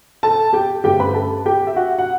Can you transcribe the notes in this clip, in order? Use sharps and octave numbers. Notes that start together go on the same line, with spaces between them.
A4 A5
G4 G5
G2 D3 A3 C#4 G4 G5
B4 B5
A4 A5
G4 G5
E5
F#4 F#5
F#5